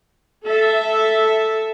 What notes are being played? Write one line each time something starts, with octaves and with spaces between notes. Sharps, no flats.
A4 E5